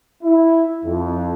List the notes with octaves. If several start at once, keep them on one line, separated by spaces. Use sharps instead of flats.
E4
F2